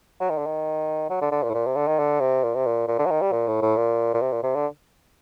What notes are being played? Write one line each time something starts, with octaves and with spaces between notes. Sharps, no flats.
F#3
D#3
D3
D#3
F#3
D3
D3
A#2
A2
A#2
C3
D3
D#3
D3
C3
A#2
C3
A#2
A#2
D3
F#3
D#3
G3
A#2
A2
A2
A#2
A#2
C3
A#2
C3
D3